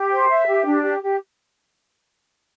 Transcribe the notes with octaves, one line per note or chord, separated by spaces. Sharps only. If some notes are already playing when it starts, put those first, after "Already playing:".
Already playing: G4
C5
E5
G4
D4
G4
G4